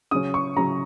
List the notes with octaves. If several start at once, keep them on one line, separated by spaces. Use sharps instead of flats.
C#3 F#3 C#4 D#6
C#6
C#3 F#3 C#4 A#5